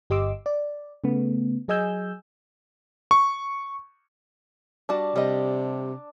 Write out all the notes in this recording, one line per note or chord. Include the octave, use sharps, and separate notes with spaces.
G1 G4 D#5 C6 D6 E6
D5
C#3 A3 B3
F#3 G#4 D#5 G#5 E6 G6
C#6
G3 D4 F#4 A5
C3 G3 D#5